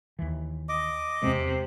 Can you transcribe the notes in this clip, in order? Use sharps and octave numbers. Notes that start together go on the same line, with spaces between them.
D#2 E3
D#5 D6
E2 C3 G#3